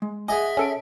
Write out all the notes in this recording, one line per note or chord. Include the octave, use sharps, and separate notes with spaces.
G#3
G#4 D#5 E5 F#5 G#5
C#4 A4 D7